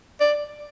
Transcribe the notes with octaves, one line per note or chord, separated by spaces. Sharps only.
D5